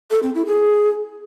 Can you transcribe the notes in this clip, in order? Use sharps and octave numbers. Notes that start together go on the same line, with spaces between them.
A4
C4
E4
G#4